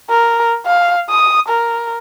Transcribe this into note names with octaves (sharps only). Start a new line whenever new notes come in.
A#4
F5
D#6
A#4